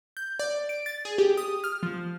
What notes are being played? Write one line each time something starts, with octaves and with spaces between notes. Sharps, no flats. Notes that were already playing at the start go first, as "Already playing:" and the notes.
G6
D5
D7
A6
G#4
G4
D#6
F6
F3